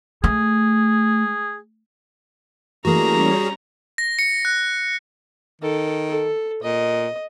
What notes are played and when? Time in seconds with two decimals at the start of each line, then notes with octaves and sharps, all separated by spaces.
0.24 A3 G#4
2.85 E3 G3 A3 A#3 C#4 F#4 G#4 A#5
3.98 A#6
4.19 C#7
4.45 F#6
5.62 D#3 A4
6.08 A4
6.63 A#2 D#5